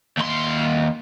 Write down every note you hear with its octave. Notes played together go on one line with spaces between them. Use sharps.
D#2 C6